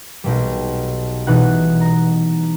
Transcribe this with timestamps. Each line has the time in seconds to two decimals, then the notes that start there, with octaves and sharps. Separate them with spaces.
0.24 B1 B2 G3
1.27 B2 E3 B3 D#4 F#5 F#6
1.81 A#5